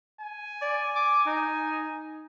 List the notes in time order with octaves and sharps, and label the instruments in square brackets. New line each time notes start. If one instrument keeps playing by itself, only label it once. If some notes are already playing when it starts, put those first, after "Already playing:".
[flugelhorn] G#5
[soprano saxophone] D5
D6
D#4